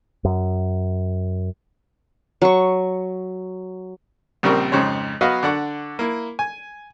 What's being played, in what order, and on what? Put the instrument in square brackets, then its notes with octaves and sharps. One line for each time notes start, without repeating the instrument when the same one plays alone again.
[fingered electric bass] F#2
[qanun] F#3 C#6
[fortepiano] A#1 C#3 G3 C4 A#4 C#6
F2 G#2 C#3 G4 C5 C#5
F#3 B3 F#4 B4 D#5 F5
D3 D5 F#5 C#6
A#3 E4
G#5